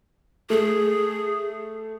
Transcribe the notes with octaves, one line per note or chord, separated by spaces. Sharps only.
A3 G#4